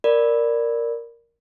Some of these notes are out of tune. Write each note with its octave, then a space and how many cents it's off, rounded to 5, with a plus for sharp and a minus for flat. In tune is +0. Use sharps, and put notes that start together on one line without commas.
A#4 +0 D5 +0 B5 +0